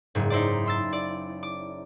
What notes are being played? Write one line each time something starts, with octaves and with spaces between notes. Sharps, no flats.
F#1 G#2
D#4 E4 C5 D5
C6 E6 A6
D5
D6